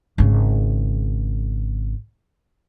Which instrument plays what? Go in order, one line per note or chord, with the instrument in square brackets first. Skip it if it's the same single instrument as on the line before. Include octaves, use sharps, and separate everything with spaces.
[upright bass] G#1 C#3